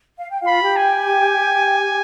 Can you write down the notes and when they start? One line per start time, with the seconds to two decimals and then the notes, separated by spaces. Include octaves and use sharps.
0.18 F5
0.30 G5
0.41 F4 F5
0.47 B5
0.62 G4 G5
0.76 G#5